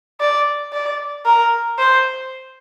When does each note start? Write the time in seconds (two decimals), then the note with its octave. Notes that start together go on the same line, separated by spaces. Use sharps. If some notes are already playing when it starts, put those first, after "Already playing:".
0.20 D5
0.73 D5
1.26 A#4
1.78 C5